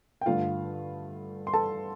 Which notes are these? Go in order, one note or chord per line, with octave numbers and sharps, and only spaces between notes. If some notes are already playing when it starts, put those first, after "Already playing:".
G5
G2 D3 A3 F4 F5
C6
A4 A5